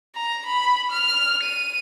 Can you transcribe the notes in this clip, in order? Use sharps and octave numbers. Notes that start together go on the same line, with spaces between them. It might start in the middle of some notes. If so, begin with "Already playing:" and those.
A#5
B5
F6
D#7